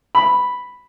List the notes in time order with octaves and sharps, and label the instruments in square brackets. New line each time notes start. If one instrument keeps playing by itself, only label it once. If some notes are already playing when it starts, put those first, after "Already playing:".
[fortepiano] B5